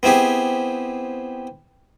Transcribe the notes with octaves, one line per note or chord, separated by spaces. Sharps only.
B3 C4 E4 G4 G#4